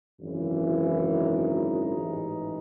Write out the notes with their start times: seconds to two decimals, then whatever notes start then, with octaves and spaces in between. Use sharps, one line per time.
0.20 G#1 F#2 C#3 E3
0.64 E4
1.08 D#4
1.96 A1 G#2 E3